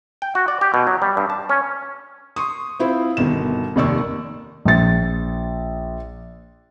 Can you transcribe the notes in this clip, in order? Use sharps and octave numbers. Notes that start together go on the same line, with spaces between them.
G5
F#4
D5
G4
B2
F#3
G3
G2
A5
C#4
C6 C#6 D#6
C4 E4 F4 C5
G1 B2 D#3 E7
F1 D#2 D#3 D5 C#6 E6
A#1 A6